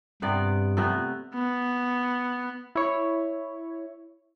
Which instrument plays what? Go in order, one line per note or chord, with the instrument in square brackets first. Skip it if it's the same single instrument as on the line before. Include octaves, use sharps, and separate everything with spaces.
[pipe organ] G2 [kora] C3 B3 D5
[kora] C3 A3 B3
[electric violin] B3
[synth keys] E4 C#5